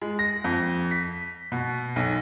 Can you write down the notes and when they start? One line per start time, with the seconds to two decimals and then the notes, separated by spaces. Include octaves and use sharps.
0.02 G#3
0.19 A#6
0.44 F2
0.91 B6
1.52 B2
1.96 B1